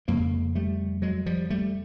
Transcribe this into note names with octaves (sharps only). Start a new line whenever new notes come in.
F2 C#3 G#3 A#3
G3 A3
F#3 G#3
F3 G3
G3 A3